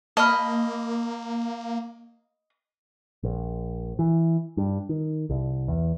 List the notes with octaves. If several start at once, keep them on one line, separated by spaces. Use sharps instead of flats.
A#3 D#5 A5 B5 F6
A#1
E3
G2
D#3
C2
E2